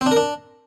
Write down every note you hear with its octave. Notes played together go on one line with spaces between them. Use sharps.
C4
D4
A#4
D4